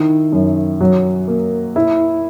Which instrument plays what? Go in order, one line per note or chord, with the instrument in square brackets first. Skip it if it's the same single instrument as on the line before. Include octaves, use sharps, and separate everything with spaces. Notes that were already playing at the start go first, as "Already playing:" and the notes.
Already playing: [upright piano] D#3 E4
F#2
F#3
A#3
E4